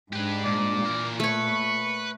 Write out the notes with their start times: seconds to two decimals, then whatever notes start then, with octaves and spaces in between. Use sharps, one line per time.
0.12 G#2 D4 G4 B4
0.44 A#2 D5
0.86 A#2 E3 A#4
1.20 A3 B4 C#5 C#6